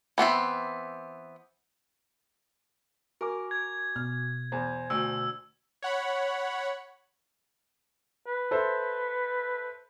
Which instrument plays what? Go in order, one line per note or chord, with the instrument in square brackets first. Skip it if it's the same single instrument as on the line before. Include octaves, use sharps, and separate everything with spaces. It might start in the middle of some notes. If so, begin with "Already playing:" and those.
[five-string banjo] E3 B3 C4 E5
[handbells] F#4 G#5 D6 [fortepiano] A#4
[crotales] G#6
[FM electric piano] B2 [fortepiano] F6
[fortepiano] E2 [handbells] C5 G#5
[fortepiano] D2 [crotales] E6
[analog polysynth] C#5 F#5 B5
[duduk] B4
[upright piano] A4 C5 E5